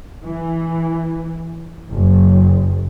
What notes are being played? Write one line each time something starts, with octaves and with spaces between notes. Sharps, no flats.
E3
F#1